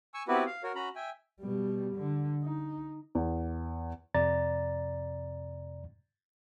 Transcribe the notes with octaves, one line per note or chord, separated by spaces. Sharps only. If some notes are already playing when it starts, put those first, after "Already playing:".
G#5 C#6 E6
B3 C4 E4 F#4 G4 B4
F5
F#4 A#4 C#5
C#4 F#4 A#5 B5
E5 G5 G#5
B2 G3
D3
D#4
E2
F2 C3 D5 A#5 A6